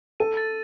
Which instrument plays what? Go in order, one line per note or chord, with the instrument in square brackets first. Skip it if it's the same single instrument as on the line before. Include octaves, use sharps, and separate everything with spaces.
[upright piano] A4 [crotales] D#7
[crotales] A6